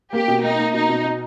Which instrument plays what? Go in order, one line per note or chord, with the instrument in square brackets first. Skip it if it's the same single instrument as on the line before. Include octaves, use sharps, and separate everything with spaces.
[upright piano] A#3 [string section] G4
[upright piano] B2
[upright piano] A#3 [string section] D#4
[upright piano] A#3
[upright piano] B2 [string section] D#4
[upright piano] B2
B2